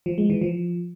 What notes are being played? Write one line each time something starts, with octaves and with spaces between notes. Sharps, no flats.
F3
G#3
E3
F3